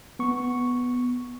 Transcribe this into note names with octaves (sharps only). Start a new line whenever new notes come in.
B3 C#6